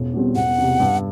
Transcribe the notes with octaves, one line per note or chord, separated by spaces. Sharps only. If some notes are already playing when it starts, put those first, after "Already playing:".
Already playing: E1
E2 B2 G3 C4
E1 F#5
E2 C3
G2